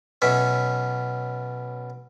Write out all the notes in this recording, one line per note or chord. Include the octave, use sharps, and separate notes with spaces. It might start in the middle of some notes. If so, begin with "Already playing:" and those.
B1 B2 C#4 E5